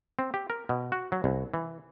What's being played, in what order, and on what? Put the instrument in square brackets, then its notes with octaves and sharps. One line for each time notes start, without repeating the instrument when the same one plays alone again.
[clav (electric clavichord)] C4
G4
A#4
B2
F#4
F#3
C2
E3